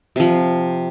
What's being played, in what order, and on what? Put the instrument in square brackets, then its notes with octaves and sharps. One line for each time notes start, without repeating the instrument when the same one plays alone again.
[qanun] C3 F3